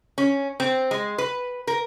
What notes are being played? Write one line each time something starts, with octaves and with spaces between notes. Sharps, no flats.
C#4
C4
G#3
B4
A#4